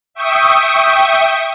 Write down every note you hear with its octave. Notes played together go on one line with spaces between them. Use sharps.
E5 G5 C#6 D#6